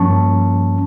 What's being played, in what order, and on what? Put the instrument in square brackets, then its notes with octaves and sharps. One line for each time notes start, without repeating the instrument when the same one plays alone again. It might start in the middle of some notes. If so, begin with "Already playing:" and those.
Already playing: [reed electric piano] G2 F3 A#3 C#4 A5 C#6